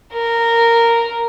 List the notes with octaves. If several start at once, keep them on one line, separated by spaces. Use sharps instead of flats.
A#4